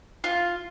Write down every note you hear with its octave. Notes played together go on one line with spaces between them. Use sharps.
F4